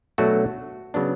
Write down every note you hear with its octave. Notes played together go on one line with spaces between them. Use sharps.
B2 F#3 A3 D4 F#4
C#3 F#3 B3 D4